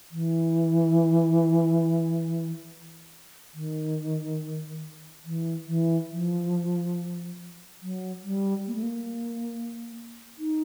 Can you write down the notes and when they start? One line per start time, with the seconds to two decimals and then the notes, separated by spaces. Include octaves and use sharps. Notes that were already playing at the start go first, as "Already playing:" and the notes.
0.11 E3
3.54 D#3
5.25 E3
5.67 E3
6.11 F3
7.82 F#3
8.24 G3
8.67 A#3
8.75 A3
8.82 A#3
10.38 D#4